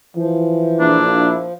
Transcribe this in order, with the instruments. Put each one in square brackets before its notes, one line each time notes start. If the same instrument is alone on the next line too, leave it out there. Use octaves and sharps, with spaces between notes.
[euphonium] E3 [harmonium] F3
[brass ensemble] A#1 A#3 E4 [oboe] D4